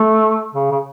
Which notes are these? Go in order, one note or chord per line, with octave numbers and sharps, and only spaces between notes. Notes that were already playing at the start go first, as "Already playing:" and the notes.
Already playing: A3
C#3
C#3